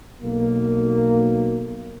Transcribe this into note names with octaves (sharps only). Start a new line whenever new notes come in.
B1 A#3